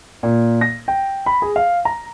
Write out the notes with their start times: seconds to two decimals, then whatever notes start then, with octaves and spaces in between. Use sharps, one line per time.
0.23 A#2
0.61 A#6
0.88 G5
1.26 B5
1.42 G#4
1.56 F5
1.85 A#5